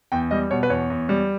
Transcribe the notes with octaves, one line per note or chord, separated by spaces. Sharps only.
E2 G5
G3 D#5
B2 C#5
B4
E2 C#5
E2
G3